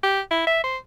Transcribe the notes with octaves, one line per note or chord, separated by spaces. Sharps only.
G4
E4
E5
C5